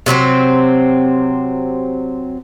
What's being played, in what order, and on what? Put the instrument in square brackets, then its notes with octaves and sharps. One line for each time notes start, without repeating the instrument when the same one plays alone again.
[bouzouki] C3 F#3 B3 C4